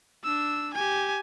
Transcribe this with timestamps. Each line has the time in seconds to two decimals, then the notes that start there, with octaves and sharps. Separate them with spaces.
0.24 D4 E6
0.74 G4 G#5